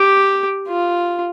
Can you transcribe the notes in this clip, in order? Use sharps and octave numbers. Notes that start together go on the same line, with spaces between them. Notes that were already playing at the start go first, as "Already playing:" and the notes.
Already playing: G4
F4